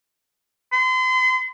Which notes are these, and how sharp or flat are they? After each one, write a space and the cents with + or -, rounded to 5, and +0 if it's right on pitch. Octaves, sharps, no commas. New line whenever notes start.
C6 -35